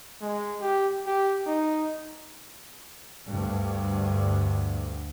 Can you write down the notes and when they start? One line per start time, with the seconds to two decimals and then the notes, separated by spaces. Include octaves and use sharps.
0.22 G#3
0.61 G4
1.07 G4
1.47 D#4
3.29 D2 G2